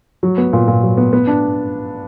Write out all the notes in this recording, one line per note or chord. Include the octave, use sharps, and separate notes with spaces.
F#3
B3
A#2
A#2
F#3
B3
B3
D4